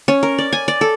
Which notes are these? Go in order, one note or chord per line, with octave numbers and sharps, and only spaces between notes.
C#4
A#4
D5
G#5
D5
A4